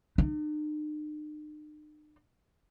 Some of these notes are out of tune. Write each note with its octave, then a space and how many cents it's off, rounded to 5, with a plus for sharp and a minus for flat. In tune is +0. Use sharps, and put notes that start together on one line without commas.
D#4 -45